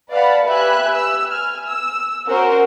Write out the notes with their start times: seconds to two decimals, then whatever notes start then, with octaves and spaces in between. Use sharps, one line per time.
0.10 B4 D5 F5 F#5 A5 B5
0.45 G4 B4 E5 G#5 B5 F#6
0.93 E6
1.27 G#5 F6
1.64 E6
2.26 C#4 F#4 A#4 C5